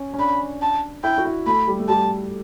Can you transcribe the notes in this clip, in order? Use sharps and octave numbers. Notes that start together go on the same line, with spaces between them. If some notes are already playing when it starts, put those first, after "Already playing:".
Already playing: C#4
C#4
D4 B5
A5
E4 G5
F#4
E4
A3 B5
G3
A3
G3 A5